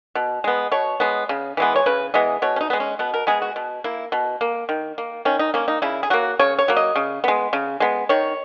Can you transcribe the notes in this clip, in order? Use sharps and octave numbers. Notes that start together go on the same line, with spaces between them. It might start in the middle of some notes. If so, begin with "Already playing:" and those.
B2
G#3 B3
B2 C#5
G#3 B3
C#3
E3 G#3 B3
C#5
C#3 B4
E3 G#3 B3 D#5
B2 C#5
C#4
D#4
G#3 B3
C#4
B2 B3
A#4
G#3 B3 G#4
F#4
B2
A#3 E4
B2
A#3
D#3
A#3
D#3 C#4
D#4
A#3 C#4
D#4
C#3 E4
G#4
F#3 A#3 F#4
C#3 C#5
C#5
F#3 A#3
D#5
C#3
G#3 B3
C#3
G#3 B3
D#3 C#5